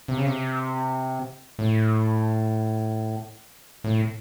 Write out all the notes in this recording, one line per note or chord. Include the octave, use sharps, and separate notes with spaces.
C3
C#3
C3
A2
A2